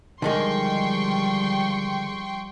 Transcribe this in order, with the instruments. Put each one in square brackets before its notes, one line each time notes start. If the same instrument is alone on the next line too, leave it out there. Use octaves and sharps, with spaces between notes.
[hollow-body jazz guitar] D3 D#3 G#3 [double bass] F3 G3 [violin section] G5 C6 C#6